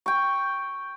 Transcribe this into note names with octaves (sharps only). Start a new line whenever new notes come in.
G5 C#6